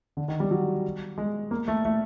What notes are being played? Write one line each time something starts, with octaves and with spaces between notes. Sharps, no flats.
D3
D#3
G3
F#3
G#3
A#3
A3
A3